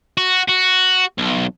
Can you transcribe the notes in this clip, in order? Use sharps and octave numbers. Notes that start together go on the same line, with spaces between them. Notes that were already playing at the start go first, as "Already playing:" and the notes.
F#4
F#4
B1